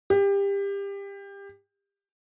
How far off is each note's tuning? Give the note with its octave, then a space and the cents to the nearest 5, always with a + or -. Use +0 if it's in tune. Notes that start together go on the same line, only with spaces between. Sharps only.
G4 +25